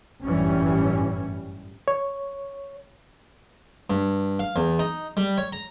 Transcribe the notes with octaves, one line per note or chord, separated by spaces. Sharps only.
G1 F#2 A2 E3 G3 C#4
C#5
G2
F5
E2
D#4
G3
C#5
A#5